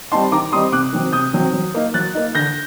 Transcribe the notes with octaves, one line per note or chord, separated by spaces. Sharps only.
G3 C4 D#4 A5 C6
D#3 A#5 D6
G3 C4 D#4 C6 D#6
C3 D6 F#6
D#3 F#3 C4
C3 D#6 G6
D#3 F#3 C4
F#3
A#3 D#4
F#3 F#6 A6
A#3 D#4
D3 G6 A#6